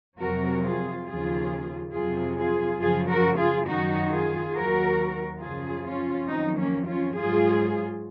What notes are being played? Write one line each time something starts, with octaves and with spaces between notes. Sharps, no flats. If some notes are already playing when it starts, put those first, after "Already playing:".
F2 C3 F#3 F#4 A#4
F4 G#4
D#2 C#3 F3 F4 G#4
F2 C3 F#3 F4 G#4
F4 G#4
F#2 C#3 F3 F4 G#4
F#4 A#4
F4 G#4
F#2 D#3 F#3 D#4 F#4
F4 G#4
D#2 D#3 F#3 F#4 A#4
F#2 C#3 F3 F4 G#4
C#4 F4
F2 D#3 F#3 C4 D#4
A#3 C#4
C#4 F4
G#2 F#3 F4 G#4